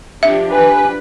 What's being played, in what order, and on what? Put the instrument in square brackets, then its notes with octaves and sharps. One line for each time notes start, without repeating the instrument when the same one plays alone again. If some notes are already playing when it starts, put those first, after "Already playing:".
[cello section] F3 D4 G4 [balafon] E5
[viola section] B4 [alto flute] G#5